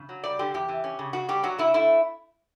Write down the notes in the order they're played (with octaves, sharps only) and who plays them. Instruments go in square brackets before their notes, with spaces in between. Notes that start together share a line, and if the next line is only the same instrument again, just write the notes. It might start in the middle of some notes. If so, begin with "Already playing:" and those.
Already playing: [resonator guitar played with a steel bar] C#3
F#3
G3 D5
D3 G4
E2 G4
E3
C#4
C#3
C#3 F#4
G3 G4
F#3 F#4
B3 E4
A3 E4